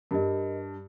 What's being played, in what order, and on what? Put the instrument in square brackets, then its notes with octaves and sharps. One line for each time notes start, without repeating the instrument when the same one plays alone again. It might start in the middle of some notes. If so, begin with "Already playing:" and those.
[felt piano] G2 [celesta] A#4 D#5